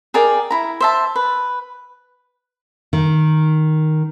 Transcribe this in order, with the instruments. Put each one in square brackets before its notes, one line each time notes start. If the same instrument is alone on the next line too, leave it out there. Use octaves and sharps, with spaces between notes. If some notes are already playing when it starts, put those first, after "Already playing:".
[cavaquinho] G#4 A#4 D5 G5
E4 A#5
C5 E5 A5
B4
[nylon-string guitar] D#3